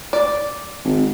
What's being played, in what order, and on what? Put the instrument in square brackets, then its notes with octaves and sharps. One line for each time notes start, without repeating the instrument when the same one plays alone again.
[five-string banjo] D5
[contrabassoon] G#1